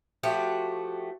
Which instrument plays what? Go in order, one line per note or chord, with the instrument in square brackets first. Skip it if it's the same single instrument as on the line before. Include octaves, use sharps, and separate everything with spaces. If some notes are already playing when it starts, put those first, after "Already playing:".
[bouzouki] F3 A3 F#4 G4